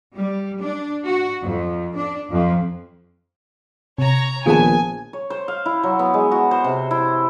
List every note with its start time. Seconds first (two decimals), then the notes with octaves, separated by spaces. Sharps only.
0.15 G3
0.60 D4
1.06 F#4
1.46 F2
1.96 D4
2.31 F2
3.98 C3 C#5 A#5
4.46 A#1 D#3 B3 F4 G#4 B4 G#5 A5
5.13 C#5
5.30 C5
5.48 F5
5.66 E4
5.83 F#3
5.99 B3
6.14 G#3
6.31 F#4
6.51 C5
6.64 C3
6.91 E4